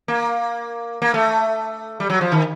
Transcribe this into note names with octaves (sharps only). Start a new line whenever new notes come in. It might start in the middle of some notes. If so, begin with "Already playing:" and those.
A#3
A#3
A3
G3
F#3
F3
D#3